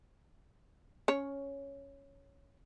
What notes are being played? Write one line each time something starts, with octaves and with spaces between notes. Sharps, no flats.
C#4 C#5